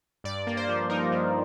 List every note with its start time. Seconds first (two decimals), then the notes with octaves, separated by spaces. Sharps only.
0.24 G2 D5
0.47 A#3
0.57 C5
0.69 F3
0.89 D#4 A#4
1.12 G2